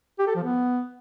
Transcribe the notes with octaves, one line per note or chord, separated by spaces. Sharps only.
G4
A4
F3
B3